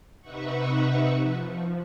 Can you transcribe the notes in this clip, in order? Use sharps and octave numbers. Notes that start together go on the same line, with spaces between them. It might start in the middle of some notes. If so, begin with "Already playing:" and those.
C3 D#4 B4 E5 F#5 C#6
F3